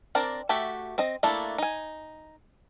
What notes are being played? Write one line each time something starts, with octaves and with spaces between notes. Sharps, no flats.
C4 D4 A#4 D5
A3 F#4 G4 E5
C4 D#5
A3 A#3 D4 E4 A4
D#4 G#5